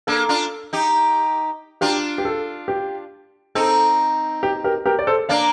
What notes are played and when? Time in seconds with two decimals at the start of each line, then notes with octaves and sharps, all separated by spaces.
0.07 A#3 D4 A4
0.29 D4 F4
0.73 D#4 G4
1.81 D4 F4 G4
2.18 G4
2.25 A4
2.68 G4
3.55 C4 D#4 A4
4.43 G4
4.64 G4 A#4
4.86 G4 A#4
4.99 D5
5.07 A4 C5
5.29 A#3 D4 D5 F5